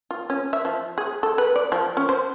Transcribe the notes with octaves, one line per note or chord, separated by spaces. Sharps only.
F4
C#4
E5
F3
G#4
A4
B4
D5
F3
C#4
C5